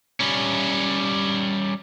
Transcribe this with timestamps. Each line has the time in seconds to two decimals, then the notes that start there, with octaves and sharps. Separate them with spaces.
0.20 G3 C#4